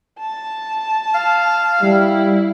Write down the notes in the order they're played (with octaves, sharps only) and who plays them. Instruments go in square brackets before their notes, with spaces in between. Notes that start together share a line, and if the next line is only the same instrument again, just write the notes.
[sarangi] A5
[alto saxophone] F5
[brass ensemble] G3 [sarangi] E4